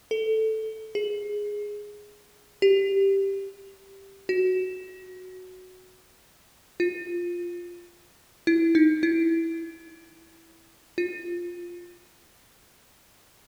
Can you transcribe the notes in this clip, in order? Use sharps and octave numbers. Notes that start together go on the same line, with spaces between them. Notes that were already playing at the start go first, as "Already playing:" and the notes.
A4
G#4
G4
F#4
F4
E4
D#4
E4
F4